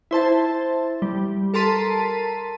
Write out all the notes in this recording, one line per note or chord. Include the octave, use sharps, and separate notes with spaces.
E4 C5 A5
G3
A4 A#4 A5 C6 B6 D#7